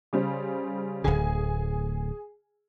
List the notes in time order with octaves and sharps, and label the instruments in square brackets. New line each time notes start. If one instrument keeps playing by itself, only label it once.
[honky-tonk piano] C#3 G3 C5
[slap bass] D1 D2 D3 [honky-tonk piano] G#4 G#5